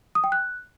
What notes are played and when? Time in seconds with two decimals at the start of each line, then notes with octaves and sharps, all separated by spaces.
0.15 D#6
0.24 G5
0.32 F#6